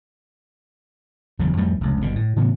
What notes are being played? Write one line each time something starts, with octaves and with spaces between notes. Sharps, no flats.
F#1 E2 D3
F2 G3 A3
F1 C#2
G1 G2 B2 D3
A2
A2 C#3 E3 B3